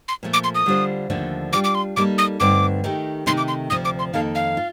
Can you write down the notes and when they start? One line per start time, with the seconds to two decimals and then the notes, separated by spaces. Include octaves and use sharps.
0.08 C6
0.23 A#2 F3 A3
0.33 D6
0.44 C6
0.55 D#6
0.66 D3 G3 D4 F4 C5
1.10 D#2 D3 F3 A3 D4
1.53 G3 D4 F4 D6
1.64 D6
1.75 C6
1.96 G3 A#3 D#4 A4 D6
2.18 D#6
2.40 G2 D3 A3 C4 D#4 D6
2.84 D#3 A3 D#4 G4
3.26 C3 D#3 A3 D#4 C6
3.37 D6
3.48 C6
3.70 D2 C3 F3 D#6
3.85 D6
3.99 C6
4.13 F2 D#3 A#3 D#4 A4 F5
4.35 F5
4.57 F4